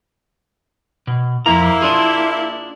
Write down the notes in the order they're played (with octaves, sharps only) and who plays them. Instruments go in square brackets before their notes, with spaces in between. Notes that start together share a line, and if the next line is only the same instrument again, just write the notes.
[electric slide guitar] B2
[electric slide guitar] F2 A#5 [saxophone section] A#3 E4
[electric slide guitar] D4 F4 G#4